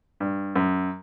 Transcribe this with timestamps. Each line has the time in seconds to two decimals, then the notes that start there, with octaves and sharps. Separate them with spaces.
0.20 G2
0.56 F#2